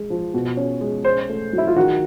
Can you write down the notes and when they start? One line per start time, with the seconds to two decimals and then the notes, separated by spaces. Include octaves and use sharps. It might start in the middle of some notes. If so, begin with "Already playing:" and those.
Already playing: G#3
0.10 F3
0.34 B2
0.57 C#4
0.81 G#3
1.05 C#4 C5
1.29 A3
1.53 F#3 E4
1.67 F4
1.77 D#3 F#4